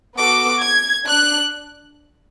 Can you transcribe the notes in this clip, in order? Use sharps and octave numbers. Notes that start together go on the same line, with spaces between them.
B3 F#4 A4 D6
G#6
D4 F#6